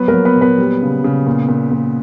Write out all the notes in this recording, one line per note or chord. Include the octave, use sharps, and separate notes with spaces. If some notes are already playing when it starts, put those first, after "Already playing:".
Already playing: F#3 B3 B4
A#3 A#4
F#3
B3 B4
A#2
B3 B4
G3
C#3
C#3
A#2
A#2
A#2